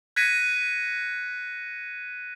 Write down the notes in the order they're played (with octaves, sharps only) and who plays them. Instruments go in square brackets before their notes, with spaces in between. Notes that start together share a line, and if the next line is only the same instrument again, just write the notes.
[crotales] F#6 G#6 A#6 B6 C#7 D#7